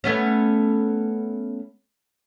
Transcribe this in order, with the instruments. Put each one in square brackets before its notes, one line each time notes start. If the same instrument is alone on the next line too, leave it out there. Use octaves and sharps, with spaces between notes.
[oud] A3 B3 C#4